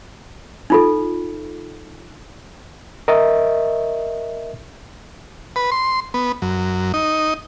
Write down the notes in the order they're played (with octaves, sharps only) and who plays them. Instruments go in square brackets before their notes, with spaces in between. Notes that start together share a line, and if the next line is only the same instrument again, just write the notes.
[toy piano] D#4 F4 A4
[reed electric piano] A#4 D#5 E5
[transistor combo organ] B4
C6
B3
F#2
D#4